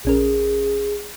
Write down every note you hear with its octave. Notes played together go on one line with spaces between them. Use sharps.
A#1 C#4 G#4 A#4